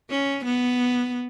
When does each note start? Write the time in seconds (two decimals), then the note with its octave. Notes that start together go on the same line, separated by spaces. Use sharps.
0.10 C#4
0.45 B3